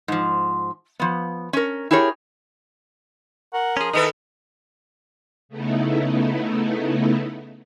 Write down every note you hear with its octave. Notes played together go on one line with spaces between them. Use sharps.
G#2 F3
F3 B3
C#4 A#4
E4 G4 G#4 A#4 C#5
A#4 F#5
F3 C#4 G#4
D#3 E4 G#4 A4 B4 D#5
C#3 A3 B3 D#4 E4